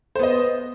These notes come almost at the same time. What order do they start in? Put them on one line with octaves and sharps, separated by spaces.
C5 B3 D#5